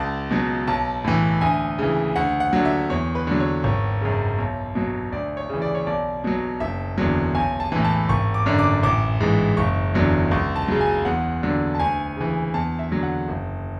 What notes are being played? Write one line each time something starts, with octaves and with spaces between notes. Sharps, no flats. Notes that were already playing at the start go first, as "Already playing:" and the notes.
Already playing: C#2 A5
B2 F#3
B1 A5
A2 E3
D2 G#5
C#3 E3
D2 F#5
F#5
D3 F#3
E5
E2 C#5
B4
D3 F#3
C#5
G#1 C#5
F#2 C#3
B1
B2 F#3
D2 D5
C#5
C#3 E3
D5
C#5
B1 D5
B2 F#3
F#1 E5
E2 D3 F#3
B1 G#5
A5
A2 E3
A5
G#1 C#6
D6
F#2 D3
D6
A1 D6
G#2 E3
F#1 C#6
E2 D3 F#3
C#2 C#6
A5
C#3 F#3
G#5
E2 F#5
D3 F#3
A5
D2 G#5
C#3 E3
E2 A5
E5
D3 F#3
F#5
F#1